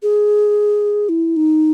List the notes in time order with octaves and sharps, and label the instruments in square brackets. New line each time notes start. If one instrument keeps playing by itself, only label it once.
[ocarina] G#4
E4
D#4